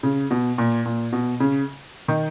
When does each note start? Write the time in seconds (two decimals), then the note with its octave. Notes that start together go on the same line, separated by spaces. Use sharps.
0.03 C#3
0.31 B2
0.58 A#2
0.86 A#2
1.13 B2
1.40 C#3
2.08 D#3